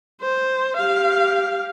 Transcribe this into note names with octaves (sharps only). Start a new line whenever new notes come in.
C5
G4 F5